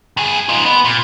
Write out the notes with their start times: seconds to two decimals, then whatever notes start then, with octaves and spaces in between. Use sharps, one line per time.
0.17 G2 G#4
0.49 D#4 F4
0.65 B3
0.85 A#2